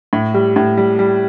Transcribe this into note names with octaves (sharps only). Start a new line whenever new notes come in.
A2
G3
A2
G3
G3